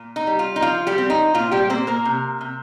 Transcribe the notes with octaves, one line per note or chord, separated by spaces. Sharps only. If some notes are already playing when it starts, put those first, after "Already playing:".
Already playing: A#2
D#4
G3
F4
D#4
F3 F4
G3 G4
C4
D#4
A#2 F4
G3 G4
A#3 C4 C5
A#3 A#4
C3
C3